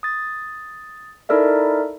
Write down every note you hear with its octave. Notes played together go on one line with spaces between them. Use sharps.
D#6 A6
D#4 E4 A4 A#4 D5 E5